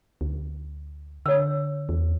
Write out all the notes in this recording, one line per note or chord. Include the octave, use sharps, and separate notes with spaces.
D2
D3 C#5 E6
E2